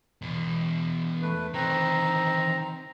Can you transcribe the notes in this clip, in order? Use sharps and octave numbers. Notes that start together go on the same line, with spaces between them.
E2 B2
A3 B4
D#3 E3 C4 A#5